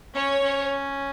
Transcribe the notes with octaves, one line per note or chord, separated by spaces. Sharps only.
C#4 C#5
C#4